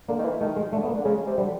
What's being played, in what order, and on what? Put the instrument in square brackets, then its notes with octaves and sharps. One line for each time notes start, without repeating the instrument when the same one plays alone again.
[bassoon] D3 [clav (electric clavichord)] A#3
[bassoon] D#3
E3
[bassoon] D#3 [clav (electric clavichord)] A3
[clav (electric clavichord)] G#3
[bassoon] D3 [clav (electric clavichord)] A3
[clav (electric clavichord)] B3
A#3
[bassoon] D3
[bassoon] C#3 [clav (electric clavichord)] G#3
[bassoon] C3
[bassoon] D3 [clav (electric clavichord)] G3